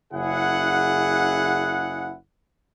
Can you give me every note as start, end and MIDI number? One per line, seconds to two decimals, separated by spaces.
0.13 2.15 30
0.13 2.15 49
0.13 2.15 64
0.13 2.15 68
0.13 2.15 78